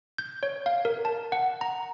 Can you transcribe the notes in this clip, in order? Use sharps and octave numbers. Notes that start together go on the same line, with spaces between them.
G6
C#5
F5
A#4
A5
F#5
A#5